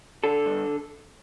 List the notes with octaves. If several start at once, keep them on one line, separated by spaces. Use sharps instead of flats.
D3 A4
G2